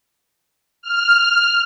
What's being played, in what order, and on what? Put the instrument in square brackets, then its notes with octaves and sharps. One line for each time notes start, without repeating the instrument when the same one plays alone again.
[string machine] F6